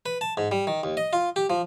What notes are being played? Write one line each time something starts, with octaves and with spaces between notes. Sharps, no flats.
B4
A5
G#2
G3
D#3
D#2
D#5
F4
G4
F3